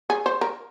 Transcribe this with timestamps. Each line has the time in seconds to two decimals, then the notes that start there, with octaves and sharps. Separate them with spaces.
0.10 G#4
0.26 C5
0.41 A#4